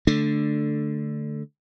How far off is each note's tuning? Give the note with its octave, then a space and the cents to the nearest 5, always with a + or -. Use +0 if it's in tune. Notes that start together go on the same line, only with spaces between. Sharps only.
D3 +0 A3 +0 D4 +5